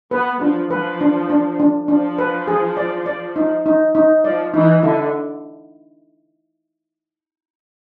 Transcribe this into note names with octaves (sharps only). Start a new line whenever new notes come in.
B3 B4
F3 D4
F3 B4
D4
D4
D4
F3 D4
B4
G#4
D5
D5
D#4
D#4
D#4
F3 D5
E3 D#4
D3 E4